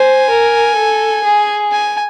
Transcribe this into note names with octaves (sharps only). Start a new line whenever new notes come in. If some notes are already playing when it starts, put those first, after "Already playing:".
Already playing: C5 G#5
A#4
A4
G#4
G#5